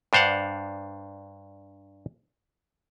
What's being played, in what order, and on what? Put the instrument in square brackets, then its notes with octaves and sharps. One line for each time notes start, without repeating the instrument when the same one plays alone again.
[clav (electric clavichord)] G2 D4 C5 F5 F#5